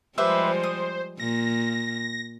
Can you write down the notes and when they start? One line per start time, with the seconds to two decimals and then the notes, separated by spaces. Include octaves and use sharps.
0.18 F3 G3 G#3 G4 B4 C5 E5
0.63 D#6
1.20 A#2 A#6